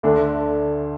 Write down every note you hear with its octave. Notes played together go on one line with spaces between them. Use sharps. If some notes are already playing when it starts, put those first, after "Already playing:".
D2 D3 A3 D4